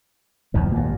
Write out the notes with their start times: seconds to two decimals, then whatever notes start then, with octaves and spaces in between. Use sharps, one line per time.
0.54 E2 D#3 F3
0.72 G#1 G2 A#2